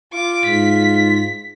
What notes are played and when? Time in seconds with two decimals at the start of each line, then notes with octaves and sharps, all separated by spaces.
0.13 F4 D6
0.45 G#2 B6